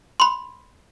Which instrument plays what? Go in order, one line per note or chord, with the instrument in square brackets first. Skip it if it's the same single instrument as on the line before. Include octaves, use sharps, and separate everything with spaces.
[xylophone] B5 C6